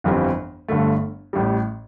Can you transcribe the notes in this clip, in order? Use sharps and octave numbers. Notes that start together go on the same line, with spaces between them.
G1 F2 E3 G3 C4
G1 G2 D3 A3
A1 A2 G3